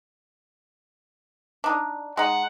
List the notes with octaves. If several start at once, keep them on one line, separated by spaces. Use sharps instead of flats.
D4 D#4
G#3 D#4 F#5